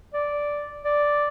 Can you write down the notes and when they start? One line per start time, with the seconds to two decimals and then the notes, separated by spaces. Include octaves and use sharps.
0.14 D5
0.84 D5